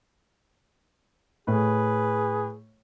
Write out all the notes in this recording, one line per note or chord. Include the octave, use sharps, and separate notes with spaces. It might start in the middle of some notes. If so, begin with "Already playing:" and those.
A2 G#4 B4